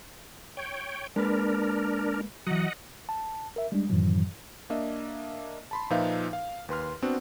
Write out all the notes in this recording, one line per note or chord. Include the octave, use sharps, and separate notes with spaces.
C#5 G5
G#3 A#3 D4 A#4 B4
E3 F#3 D#5 F#5
A5
A#4 E5
G3 G#3 D4
F#2 A2 D#3 E3 F#3
A#3 D4 D#5 E5
A5 B5 C6
A#2 F3 D#4 B4 E5 F5
F5
D#2 B4 C6 F6
B3 C4 D4 F#4